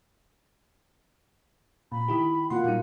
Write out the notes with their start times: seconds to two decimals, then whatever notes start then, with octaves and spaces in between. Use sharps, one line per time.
1.92 A#2 B5
2.08 D#3 E4 G4
2.50 B2 A#3 F4 F#5 C6
2.64 A#2 F#3 G3 D#4